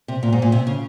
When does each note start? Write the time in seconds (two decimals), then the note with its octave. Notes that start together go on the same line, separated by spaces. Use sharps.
0.08 C3
0.23 A#2
0.33 G#2
0.42 A#2
0.52 C3
0.67 C#3